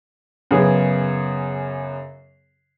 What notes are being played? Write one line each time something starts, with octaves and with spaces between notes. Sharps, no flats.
F#2 C#3 B3 G#4